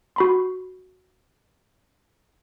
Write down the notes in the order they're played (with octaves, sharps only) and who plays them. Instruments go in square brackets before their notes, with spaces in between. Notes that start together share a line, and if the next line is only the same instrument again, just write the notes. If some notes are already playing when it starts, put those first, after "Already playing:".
[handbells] F#4 B5 C6